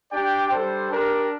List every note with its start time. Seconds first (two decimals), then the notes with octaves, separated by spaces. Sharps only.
0.12 D4 G4 D5 G5
0.51 G3 D4 A4 C5
0.90 D4 G4 A#4